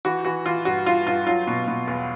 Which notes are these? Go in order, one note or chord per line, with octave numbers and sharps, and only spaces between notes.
E3 F#4
E3 F#4
E3 F4
G2 F#4
G2 F4
G2 F4
F#3 F4
B2
B2
E2